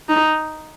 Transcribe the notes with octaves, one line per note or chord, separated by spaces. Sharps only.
D#4